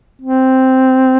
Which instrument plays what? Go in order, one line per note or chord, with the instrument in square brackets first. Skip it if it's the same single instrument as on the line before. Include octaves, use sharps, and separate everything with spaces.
[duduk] C4